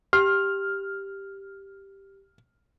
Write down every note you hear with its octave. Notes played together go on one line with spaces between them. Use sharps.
G4 F6